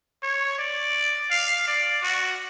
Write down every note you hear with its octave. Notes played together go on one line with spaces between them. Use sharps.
C#5
D5
F5
D5
F#4